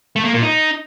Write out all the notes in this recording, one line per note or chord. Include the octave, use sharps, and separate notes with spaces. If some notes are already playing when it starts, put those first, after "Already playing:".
A3
A#3
A#2
D#4